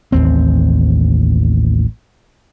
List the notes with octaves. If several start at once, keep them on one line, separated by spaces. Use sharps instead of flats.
A1 D#2 C4